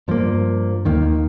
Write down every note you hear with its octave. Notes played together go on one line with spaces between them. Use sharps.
G2 F3 A#3
D#2 D#3 A#3